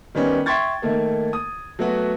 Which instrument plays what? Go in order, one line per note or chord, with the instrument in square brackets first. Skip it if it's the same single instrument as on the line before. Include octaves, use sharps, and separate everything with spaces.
[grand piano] D#3 G3 B3 C#4
E5 G5 C6 C#6 G#6 A6
D#3 A3 A#3
D#6
F#3 A3 B3 F#4